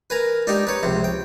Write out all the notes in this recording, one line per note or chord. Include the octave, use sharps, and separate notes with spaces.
A#4 B4 G#5 A#5
G#3 D4 D#4 G4
B4 C#5 A#5
C#2 C3 F3
G5